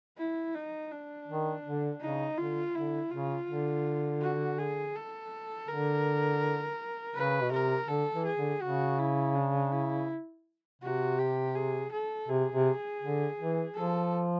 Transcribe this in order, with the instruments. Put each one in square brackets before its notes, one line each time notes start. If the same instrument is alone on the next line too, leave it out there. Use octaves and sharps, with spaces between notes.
[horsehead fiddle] E4
D#4
D4
[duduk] D#3
D3
[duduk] C#3 [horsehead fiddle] D#4
[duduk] D3 [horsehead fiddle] F4
[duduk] D3 [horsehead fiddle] E4
[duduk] C#3 [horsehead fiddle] F4
[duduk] D3
[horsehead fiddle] F#4
G#4
A4
[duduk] D3 [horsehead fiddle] A#4
[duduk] C#3 [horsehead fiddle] B4
[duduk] B2
[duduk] C3 [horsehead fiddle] A#4
[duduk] D3 [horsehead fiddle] A4
[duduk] E3
[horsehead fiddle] G#4
[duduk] D3
[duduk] C#3 [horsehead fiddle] F#4
[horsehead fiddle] E4
D4
E4
[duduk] C3 [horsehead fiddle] F#4
[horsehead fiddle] G4
G#4
A4
[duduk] C3 [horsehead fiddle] G#4
[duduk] C3
D3
E3
[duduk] F3 [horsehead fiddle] A4